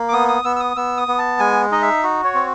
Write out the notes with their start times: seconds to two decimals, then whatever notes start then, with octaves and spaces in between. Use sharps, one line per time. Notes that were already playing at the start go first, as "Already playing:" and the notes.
Already playing: A#3
0.09 D6
0.13 B3 D#6
0.28 D#6
0.45 B3 E6
0.56 E6
0.60 D#6
0.76 B3 E6
0.97 D#6
1.08 B3
1.18 A5
1.39 G#3 G#5
1.71 D#4 D#5
1.82 E5
2.03 F#4
2.24 C#5
2.35 C4